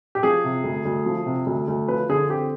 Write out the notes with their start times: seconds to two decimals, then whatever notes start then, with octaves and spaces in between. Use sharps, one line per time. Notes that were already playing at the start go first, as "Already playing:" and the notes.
0.15 G4
0.23 F3 G#4
0.44 C3
0.64 D2
0.85 D2
1.06 F3
1.26 C3
1.46 D2
1.68 D2
1.88 F3 B4
2.09 D3 G#4
2.30 C4 G4